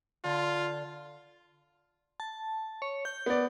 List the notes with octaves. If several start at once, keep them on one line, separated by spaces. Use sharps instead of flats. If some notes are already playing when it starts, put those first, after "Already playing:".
D3 F4
A5
C#5
G6
B3 D5